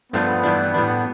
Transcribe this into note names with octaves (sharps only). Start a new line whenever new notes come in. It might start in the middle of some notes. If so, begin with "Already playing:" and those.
G2 F3 A3 B3 D4 F4
G2 E3 G3 D4
A2 G3 D4